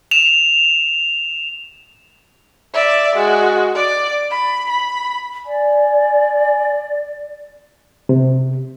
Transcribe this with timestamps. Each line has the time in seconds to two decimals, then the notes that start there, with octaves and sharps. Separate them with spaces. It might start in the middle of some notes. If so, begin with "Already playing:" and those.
0.11 E7 F7
2.74 D5 E5
3.16 G#3 F#4
3.75 D5 D6
4.31 B5
4.69 B5
5.47 D5 G#5
8.09 C3